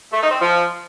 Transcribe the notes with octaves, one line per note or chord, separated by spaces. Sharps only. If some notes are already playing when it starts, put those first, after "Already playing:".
A3
D#4
C4
F3